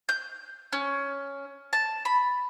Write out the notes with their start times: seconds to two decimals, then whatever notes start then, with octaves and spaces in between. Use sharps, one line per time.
0.09 G6
0.72 C#4
1.73 A5
2.05 B5